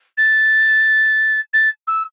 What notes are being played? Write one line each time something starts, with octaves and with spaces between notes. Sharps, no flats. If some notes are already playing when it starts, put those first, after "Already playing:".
A6
A6
E6